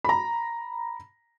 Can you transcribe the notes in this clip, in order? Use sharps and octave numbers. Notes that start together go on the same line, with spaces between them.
A#5 B5